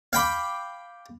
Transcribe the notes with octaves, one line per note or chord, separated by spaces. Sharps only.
F5 G5 B5 D6